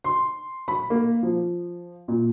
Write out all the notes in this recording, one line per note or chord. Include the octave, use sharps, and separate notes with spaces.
C6
B5
A#3
F3
A#2